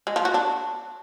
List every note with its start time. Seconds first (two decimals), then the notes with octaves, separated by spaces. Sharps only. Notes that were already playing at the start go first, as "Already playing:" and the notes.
0.07 G#3
0.16 F3
0.25 F#4
0.34 D4